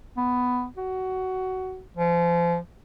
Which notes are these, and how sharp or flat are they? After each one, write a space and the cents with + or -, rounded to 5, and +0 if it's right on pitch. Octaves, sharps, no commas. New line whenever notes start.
B3 +10
F#4 +15
F3 -30